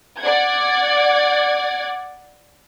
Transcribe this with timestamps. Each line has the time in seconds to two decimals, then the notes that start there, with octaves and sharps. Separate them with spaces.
0.19 D5 F#5 G#6